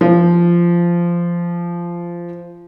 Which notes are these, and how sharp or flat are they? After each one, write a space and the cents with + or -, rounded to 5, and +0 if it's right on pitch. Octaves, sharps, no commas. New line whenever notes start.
F3 -15